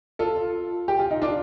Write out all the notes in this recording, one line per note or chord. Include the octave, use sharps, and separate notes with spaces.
F4 A4
G4
F4
D#4
D4 F4